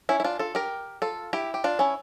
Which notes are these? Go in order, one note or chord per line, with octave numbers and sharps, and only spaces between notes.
C#4 E4
E4
D4 F4
F4 A4
G4 A#4
F4 A4
E4 G4
G4
D4 F4
C#4 E4